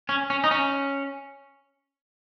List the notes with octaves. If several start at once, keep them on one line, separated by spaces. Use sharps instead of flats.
C#4
C#4
D#4
C#4